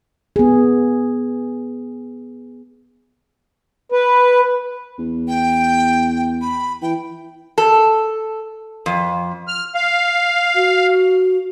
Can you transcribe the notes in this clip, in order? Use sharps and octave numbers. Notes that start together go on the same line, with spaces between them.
B3 G#4
B4
E2
G5
B5
E3 G5
A4
F2
F6
F5
F#4